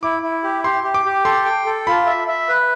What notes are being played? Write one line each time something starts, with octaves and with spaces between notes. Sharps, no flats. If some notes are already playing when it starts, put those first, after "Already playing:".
E4 D6
E4
G4
G4 C6
G4
D6
G4
A4 C6
G5
A4
F4 B5
E5
E5
B4